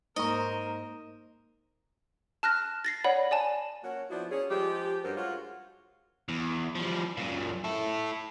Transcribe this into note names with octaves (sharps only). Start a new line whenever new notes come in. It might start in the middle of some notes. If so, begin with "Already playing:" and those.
G#2 A#3 A#4 C5 D#5 A#5 C#6
A5 F6 F#6 A#6
A6 A#6 C7
C#5 D5 F#5 B5
D5 G#5 A5
A#3 C#4 F#4
F3 B3 D4 E4 F#4
C#4 G#4
F3 G#3 G4
G2 F#3 C#4 A#4 C5
G#3 F4 F#4 C#5
E2
F3 G3
F#2 A#2
E4 A4